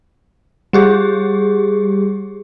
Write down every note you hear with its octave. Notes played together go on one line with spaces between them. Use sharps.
G3 G4 G#4